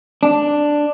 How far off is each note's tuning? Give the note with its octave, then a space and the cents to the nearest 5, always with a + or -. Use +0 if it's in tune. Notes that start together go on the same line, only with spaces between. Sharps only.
D4 +5